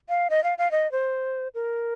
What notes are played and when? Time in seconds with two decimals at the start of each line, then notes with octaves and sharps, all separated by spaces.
0.09 F5
0.30 D#5
0.44 F5
0.58 F5
0.71 D#5
0.92 C5
1.55 A#4